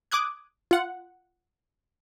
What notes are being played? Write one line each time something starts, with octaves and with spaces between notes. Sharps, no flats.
D6 D#6 F#6 G#6
F4 F#5